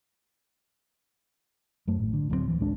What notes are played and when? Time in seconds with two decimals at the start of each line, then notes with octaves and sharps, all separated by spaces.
1.88 F#2 A3
1.99 G#1 A2
2.13 D3
2.30 D1 F#3 G3 C4
2.48 E3
2.60 A1 D2 G#3 D4